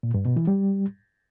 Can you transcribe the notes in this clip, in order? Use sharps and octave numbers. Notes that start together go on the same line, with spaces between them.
A#2
G2
B2
E3
G3